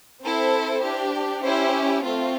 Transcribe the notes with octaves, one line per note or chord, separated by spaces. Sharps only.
C4 E4 A4 C5
D4 G4
C#4 E4 G4 C5
A3 C4 F4